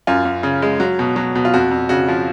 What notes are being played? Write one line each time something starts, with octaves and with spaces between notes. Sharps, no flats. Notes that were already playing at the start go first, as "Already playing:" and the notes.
F#2 F4
F#2
C#3
G#3
F#3
B2
F#3
B2
F4
F2 F#4
F2
C#3 F#4
F3